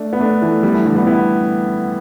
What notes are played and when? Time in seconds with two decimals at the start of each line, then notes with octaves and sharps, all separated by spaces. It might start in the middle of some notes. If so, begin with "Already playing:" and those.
Already playing: A3 D4
0.13 B3
0.20 A3 D4
0.42 E3 A3
0.63 G3 B3
0.74 E3 A3
0.85 D3 G3
0.96 G3 B3
1.07 B3 E4